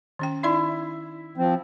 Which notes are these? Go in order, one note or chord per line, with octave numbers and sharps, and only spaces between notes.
D#3 C#4 G5
D#4 E4 D5 C6
F3 C4